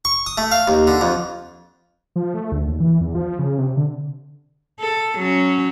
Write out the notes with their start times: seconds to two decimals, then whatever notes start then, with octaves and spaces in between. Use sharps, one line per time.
0.05 C#6
0.26 D#6
0.38 A3
0.52 F5
0.68 D#2
0.87 D3
1.01 F2
2.16 F3
2.34 A3
2.52 D2
2.68 D#2
2.80 E3
3.01 E2
3.15 F3
3.39 C#3
3.58 C3
3.77 D3
4.79 A4
5.18 F#3 C#4